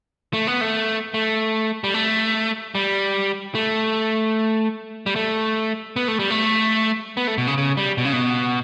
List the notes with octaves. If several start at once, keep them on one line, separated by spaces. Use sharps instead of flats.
A3
B3
A3
A3
G3
A3
G3
A3
G3
A3
B3
A3
G3
A3
B3
A3
B2
C#3
C#3
G3
B2
C#3
B2